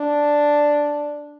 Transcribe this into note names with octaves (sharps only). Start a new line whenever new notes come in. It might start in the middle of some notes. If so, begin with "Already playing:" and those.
Already playing: D4